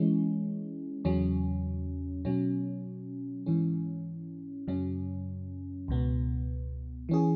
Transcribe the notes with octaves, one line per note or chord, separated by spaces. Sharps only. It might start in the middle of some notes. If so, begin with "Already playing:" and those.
Already playing: E3 G#3 C#4
E2 C#3 F#3 C#4
B2 F#3 C#4
G#2 E3 C#4
F#2 C#3 F#3 C#4
C#2 B2 B3
E3 C#4 G#4